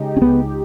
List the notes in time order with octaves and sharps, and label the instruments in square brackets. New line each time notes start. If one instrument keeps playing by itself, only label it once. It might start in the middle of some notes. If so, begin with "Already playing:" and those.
Already playing: [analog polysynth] C#3 G#3 D#4 G4
[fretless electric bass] C#4
[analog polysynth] C#2 [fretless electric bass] B3